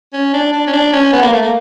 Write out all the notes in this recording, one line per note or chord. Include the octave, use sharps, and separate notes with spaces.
C#4
D4
D4
C#4
D4
C#4
B3
A#3
A3
A#3